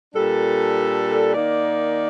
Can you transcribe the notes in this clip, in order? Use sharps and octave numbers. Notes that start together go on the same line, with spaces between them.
A#2 G3 D4 A4
D#3 A#3 D#4 A#4 D5